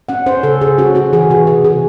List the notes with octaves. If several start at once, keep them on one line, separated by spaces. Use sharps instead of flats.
C#4 F#5
C#4 C5
C#3 A4
C#3 G#4
C#4 F#4
C#4 F#4
E3 G#4
C3 F#4
C3 G#4
C3 G#4